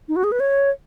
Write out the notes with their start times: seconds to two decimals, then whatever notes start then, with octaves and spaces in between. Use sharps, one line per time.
0.08 D#4
0.16 F#4
0.24 G#4
0.32 B4
0.40 C#5